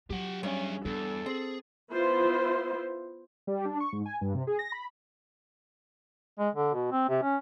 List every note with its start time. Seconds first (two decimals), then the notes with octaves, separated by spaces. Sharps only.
0.10 F#3 G4 F#5
0.43 G2 C#4 G#4 E5
0.85 E2 D4 A4
1.26 C4 G#4
1.92 B3 E4 F4 C5
3.47 G3
3.65 D4
3.80 C#6
3.92 G#2
4.06 G#5
4.21 G2
4.35 C3
4.47 G#4
4.59 A#6
4.72 B5
6.39 G#3
6.55 D3
6.74 B2
6.92 C4
7.09 C3
7.23 C#4